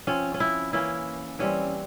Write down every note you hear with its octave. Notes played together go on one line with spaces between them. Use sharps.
F3 C4 C#4
C#4
E4
E3 A#3 C#4 E4
E3 G3 C4 C#4